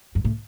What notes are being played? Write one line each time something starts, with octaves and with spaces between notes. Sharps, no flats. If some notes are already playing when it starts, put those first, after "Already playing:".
F#2
A2